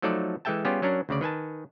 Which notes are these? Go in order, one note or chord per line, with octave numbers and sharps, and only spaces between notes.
F3 F#3 A3 D#4 A4 D5
E3 G#3 A4 E5 G5 A5
G3 B3 C#4 F4 G4 G#4
F#3 C#4 D4 A#4
D2 C#3 D5
D#3 B4 G#5 A5